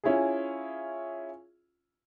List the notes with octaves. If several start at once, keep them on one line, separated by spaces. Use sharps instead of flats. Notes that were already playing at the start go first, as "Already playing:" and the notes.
C#4 E4 F4 G#4